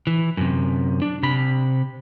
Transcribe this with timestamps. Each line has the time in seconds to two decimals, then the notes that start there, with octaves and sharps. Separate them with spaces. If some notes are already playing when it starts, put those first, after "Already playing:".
0.07 E3
0.37 F#2 C3
1.02 D4
1.23 C3 B5